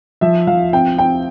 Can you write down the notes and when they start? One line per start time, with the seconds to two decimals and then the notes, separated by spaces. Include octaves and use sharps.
0.21 F3 E5
0.47 F3 F5
0.73 C4 G5
0.98 C4 G5